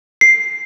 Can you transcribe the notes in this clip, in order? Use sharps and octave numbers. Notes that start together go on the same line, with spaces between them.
C7